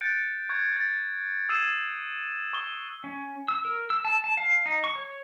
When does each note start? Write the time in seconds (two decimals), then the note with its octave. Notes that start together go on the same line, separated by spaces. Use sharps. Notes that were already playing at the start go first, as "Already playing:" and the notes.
0.01 F#6 G6 A6 C#7 D7
0.49 C#6 F#6 G#6
0.72 G6 A6
1.49 D#6 E6 G#6 C7 D#7 E7
2.53 C#6 D#6 G7
3.04 C#4
3.48 E6
3.65 A#4
3.90 E6
4.05 A5
4.24 A5
4.37 F5
4.66 D#4
4.84 C#6
4.95 C#5